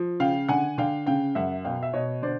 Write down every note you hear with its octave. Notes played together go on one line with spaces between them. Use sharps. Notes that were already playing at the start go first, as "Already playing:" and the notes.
Already playing: F3
C#3 F5 G5
D3 F#5 G#5
D3 F5 G5
C#3 F5 G5
F#2 E5 F#5
B2 F5 G5
E5
B2 C#5 D#5
D3 C5 D5